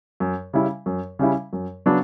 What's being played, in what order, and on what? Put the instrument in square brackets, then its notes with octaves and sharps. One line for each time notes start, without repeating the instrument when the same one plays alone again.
[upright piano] F#2
C#3 G3 C#4 E4
F#2
C#3 G3 C#4 E4
F#2
C#3 F#3 B3 D4